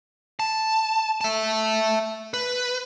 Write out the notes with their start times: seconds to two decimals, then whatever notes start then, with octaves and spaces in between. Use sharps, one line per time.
0.40 A5
1.21 E5 A5
2.34 B4